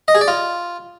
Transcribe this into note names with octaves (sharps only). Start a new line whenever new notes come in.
D#5
G#4
D5
F4